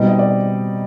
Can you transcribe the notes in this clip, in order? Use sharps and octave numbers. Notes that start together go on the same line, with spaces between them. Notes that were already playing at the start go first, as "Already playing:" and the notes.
Already playing: B2 G3 C4 D#4
D#5
D5